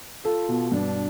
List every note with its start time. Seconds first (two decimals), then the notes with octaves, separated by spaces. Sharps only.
0.25 F4 A4
0.49 B2
0.72 G2 D4